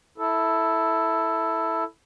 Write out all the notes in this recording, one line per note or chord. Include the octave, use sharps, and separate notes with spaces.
E4 A4